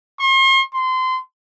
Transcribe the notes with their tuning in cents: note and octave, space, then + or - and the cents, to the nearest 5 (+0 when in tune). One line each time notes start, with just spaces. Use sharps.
C6 +45
C6 -25